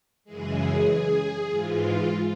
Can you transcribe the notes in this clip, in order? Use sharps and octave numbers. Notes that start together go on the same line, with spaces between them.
F#2 C#3 E3 G#3 G#4
G#2 E3 G#3 F4